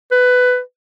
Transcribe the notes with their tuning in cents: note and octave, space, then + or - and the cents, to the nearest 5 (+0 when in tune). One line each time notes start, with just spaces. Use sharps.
B4 +15